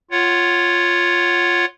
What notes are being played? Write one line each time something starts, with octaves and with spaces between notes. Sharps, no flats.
F4 C#5 F#5